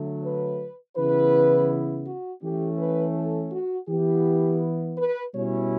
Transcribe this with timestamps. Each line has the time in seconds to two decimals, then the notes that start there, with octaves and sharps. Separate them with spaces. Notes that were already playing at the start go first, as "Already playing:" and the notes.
Already playing: D3 F#3 A3
0.24 B4
0.97 C#3 E3 B3 E4 B4
2.07 F#4
2.43 E3 A3 C#4 G4
2.79 B4
3.15 A4
3.52 F#4
3.88 E3 B3 E4 G4
4.98 B4
5.34 B2 G3 C#4 E4 C#5